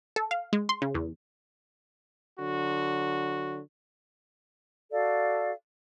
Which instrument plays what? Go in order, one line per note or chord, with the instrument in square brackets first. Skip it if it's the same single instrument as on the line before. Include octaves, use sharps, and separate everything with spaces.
[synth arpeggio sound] A4
F5
G#3
C6
C#3
E2
[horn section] D3 F#3 F#4
[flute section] F#4 A4 D5 F5